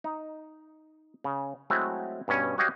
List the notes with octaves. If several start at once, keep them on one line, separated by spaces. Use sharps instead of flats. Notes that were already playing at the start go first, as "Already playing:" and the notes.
D#4
C#3
F#3 G#3 A3 C4 E4 F#4
G2 B2 C#4
F#4 G4 C#5 D#5 F5 G5